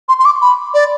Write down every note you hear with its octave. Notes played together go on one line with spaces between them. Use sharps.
C6
C6
D6
B5
D5